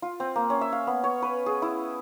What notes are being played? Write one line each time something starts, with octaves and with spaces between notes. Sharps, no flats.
F4
C4
A#3
C#4
E5
F5
B3
C#5
B4
G#4
E4